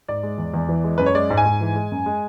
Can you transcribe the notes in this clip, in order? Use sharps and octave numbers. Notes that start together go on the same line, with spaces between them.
G#2 D5
G#3
E2
E2
E3
G#3
F#2 B4
C#5
G#3 D5
G#2
G#5
G#2
E3
G#3
F#2
G#3